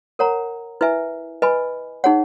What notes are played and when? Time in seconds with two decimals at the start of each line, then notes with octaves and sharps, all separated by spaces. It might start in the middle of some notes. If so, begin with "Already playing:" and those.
0.19 A#4 C#5 F#5 A#5
0.81 E4 B4 E5 G#5
1.42 B4 D#5 G#5 B5
2.04 D#4 G#4 C#5 F#5